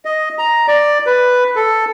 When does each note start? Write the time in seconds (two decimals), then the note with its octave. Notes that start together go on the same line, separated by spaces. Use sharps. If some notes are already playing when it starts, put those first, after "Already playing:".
0.05 D#5
0.38 A#5
0.68 D5
1.06 B4
1.56 A4